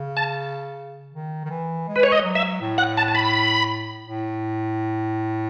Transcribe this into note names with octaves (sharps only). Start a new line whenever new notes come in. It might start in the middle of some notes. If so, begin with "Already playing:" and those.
Already playing: C#3
A5
D#3
D#3
E3
G#3
B4
C#5
D#5
F#3
E5
A2
F#5
A5
A5
B5
A2